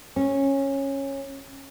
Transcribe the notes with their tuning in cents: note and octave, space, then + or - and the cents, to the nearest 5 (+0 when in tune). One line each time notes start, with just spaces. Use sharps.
C#4 -15